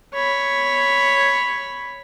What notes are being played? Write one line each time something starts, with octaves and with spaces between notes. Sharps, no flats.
C#5 B5